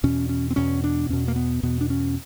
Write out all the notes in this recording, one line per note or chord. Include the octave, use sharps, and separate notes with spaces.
E2 B2 C#4
C#4
C4
E2 B2 C#4
D4
E2 B2 C#4
A#3
B3
E2 B2 B3
D4
C#4